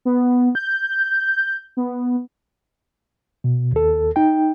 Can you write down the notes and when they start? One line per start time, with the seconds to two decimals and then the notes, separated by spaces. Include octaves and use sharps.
0.05 B3
0.55 G6
1.77 B3
3.44 B2
3.72 D#2 A4
4.16 D#4 G5